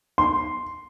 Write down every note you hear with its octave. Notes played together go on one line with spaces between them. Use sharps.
C6